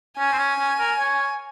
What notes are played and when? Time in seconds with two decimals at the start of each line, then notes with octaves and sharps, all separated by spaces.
0.18 C#4 G#5
0.32 C4
0.38 C#4
0.59 C#4
0.79 A#4
0.99 C#5